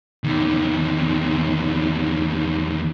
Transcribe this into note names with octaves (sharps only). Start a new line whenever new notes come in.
E2 D#3